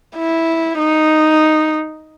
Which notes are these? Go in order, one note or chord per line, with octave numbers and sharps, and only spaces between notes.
E4
D#4